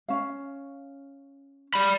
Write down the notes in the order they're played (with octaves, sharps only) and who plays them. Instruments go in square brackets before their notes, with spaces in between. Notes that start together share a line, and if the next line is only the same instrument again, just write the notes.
[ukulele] C#4 F5
[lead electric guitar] D5 B5